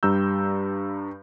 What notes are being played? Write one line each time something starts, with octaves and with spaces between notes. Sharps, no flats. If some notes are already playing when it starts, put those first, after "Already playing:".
G2 G3 A#5 E6 G6